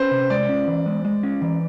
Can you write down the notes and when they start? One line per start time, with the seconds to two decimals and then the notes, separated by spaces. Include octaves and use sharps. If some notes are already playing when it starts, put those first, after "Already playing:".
Already playing: C#4 B4 C5
0.11 C3
0.30 G#3 D5
0.49 C#4
0.68 E3
0.86 G#3
1.05 G#3
1.23 C#4
1.42 E3